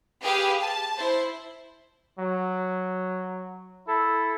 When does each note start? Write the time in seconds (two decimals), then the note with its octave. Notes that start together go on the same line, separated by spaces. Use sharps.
0.22 G4 G#4 B4 F5 G5
0.60 A5
0.97 E4 C5
2.19 F#3
3.88 E4 A4